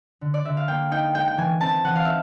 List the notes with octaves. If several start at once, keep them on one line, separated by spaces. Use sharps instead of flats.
D3
D5
D3 E5
F5
A#3 G5
D#4 G5
G#3 G5
G5
E3 G#5
C4 A5
E3 F#5
F5
D#4 E5